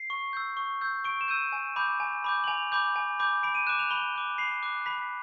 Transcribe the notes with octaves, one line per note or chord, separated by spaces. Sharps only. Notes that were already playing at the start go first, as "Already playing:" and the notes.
Already playing: C7
C#6
E6 G6
C#6
E6 G6
C#6 D7
E7
E6 G6 D#7
G#5
B5 D6 G6
G#5
B5 D6 G6
F#7
G#5 F7
B5 D6 G6
G#5
B5 D6 G6
B5 D7
D#7
D6 F#6 E7
F7
B5 G7
D6 F#6
B5 C7
D6 F#6
B5 B6